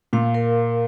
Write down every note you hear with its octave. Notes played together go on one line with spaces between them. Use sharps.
A#2 F5
A#4